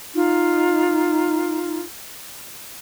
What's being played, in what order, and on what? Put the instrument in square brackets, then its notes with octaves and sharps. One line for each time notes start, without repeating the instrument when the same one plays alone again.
[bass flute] D#4 [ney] F4